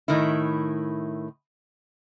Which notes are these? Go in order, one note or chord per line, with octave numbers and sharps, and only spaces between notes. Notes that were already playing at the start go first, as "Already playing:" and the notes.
A2 D#3 E4